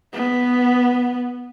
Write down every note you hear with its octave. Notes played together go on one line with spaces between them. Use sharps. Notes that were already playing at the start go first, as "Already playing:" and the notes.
B3